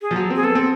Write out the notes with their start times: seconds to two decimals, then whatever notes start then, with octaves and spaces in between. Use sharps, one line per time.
0.02 G#4
0.11 F3
0.16 F#3
0.30 C4
0.35 G#4
0.43 B3 A4
0.55 C4